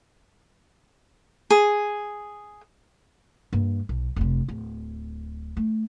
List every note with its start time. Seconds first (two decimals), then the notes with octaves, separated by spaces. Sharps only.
1.50 G#4
3.53 G2 A#3
3.89 B1
4.16 F1 C3
4.48 D1
5.57 A3